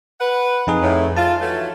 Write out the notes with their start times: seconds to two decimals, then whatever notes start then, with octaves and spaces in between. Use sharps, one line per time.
0.20 B4 F#5
0.67 F2 D#4 G#4
0.82 A2
1.17 F4 A5
1.40 E3 F#3 A3